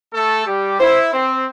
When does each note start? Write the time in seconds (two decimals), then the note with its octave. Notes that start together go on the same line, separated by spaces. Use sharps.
0.14 A3 A4
0.46 G3 G4
0.80 E4 C5
1.12 C4 C5